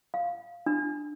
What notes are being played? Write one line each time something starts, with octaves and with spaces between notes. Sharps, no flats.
F5
D4